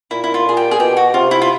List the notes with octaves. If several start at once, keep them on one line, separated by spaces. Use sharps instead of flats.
A#2 E4
E4
F4
A#2 G#4
G4
G#4
B2 G4
F#4
C3 F4
E4
F4